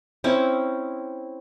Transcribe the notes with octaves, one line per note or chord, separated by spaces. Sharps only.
C4 C#4 E4